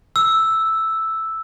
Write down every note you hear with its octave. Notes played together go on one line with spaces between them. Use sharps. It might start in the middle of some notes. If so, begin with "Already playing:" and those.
E6